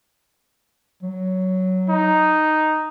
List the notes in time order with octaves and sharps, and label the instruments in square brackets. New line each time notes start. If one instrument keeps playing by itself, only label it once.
[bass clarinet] F#3
[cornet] D#4